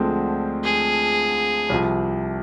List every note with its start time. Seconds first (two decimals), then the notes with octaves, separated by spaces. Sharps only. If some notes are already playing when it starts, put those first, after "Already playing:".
Already playing: D2 D3 F3 G#3 C4
0.64 G#4
1.69 C2 C3 F3